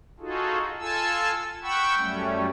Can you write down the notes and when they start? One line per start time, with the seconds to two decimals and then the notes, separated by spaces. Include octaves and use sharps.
0.20 D#4 F4 F#4 G#4 A4
0.79 F4 A4 G#5 A5 E6
1.63 F#5 G5 B5 C#6 E6
1.97 F#2 G3 A3 C#4